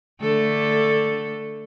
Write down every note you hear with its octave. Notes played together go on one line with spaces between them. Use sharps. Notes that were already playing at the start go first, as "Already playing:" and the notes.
D3 A3 A4